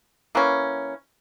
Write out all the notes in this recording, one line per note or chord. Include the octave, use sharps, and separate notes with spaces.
E3 A#3 C#4